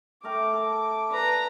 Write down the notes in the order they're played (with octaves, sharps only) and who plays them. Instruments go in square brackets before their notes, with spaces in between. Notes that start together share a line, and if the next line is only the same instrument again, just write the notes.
[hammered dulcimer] A3 A#4 G5 [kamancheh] D6
[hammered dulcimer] A4
[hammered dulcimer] D4 [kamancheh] B4 A#5